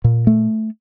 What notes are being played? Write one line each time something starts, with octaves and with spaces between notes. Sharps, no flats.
A#2
A3